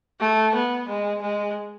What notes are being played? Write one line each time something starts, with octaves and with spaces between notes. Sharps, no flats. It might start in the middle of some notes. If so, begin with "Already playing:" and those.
A3
B3
G#3
G#3